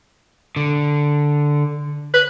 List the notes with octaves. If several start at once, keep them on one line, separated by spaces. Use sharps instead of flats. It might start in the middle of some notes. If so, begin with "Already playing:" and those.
D3
B4